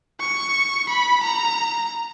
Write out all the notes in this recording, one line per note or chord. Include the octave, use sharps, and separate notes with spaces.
C#6
B5
A#5